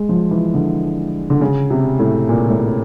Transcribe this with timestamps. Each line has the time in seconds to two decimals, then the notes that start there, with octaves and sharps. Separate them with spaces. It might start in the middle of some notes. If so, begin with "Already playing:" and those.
Already playing: G#3
0.09 F3
0.31 E3
0.54 D3
1.30 D3
1.41 C#3
1.70 C3
1.99 A2
2.29 A#2
2.50 A2